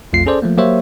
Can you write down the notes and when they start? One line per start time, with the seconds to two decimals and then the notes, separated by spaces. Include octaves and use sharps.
0.13 B1 F2 A3 F4 C7
0.26 C#4 G#4 A4 C5 D5
0.42 F3 A3 A#3
0.58 F#3 A#3 G4 C5 C#5 E5